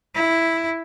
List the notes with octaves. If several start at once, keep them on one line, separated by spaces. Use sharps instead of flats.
E4